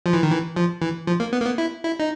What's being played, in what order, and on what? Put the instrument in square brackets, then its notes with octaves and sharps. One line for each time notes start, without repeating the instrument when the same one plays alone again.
[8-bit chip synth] F3
E3
D#3
E3
F3
E3
F3
A#3
B3
A#3
B3
E4
E4
D#4